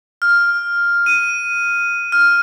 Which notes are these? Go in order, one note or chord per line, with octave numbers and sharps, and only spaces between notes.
F6
D#7
F6